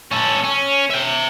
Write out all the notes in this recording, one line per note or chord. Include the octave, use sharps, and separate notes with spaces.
C#4 A4
C#4
E5 G5